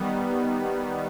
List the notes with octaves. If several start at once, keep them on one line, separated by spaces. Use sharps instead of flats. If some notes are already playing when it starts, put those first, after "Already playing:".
Already playing: D#3 G3 B3